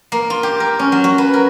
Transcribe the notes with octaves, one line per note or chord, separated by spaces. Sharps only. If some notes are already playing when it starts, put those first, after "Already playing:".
A#3
F4
G4
A#4
C#4
F#3
F#4
B4
A#4